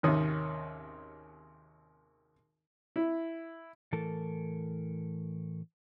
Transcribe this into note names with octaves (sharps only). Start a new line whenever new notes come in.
G#1 D#2 C3 D#3 C#4 D#6
E4
A2 E3 A4 A#4 A5